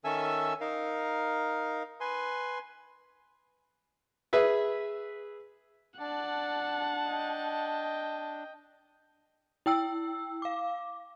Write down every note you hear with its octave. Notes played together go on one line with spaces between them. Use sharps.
D#3 C#4 A4 E5 G#5 E6
D#4 A#4 F5
B4 G#5 C6
G#4 B4 E5
D4 D5 F#5 A5
D#5 G5
E4 G5 E6
F5 D6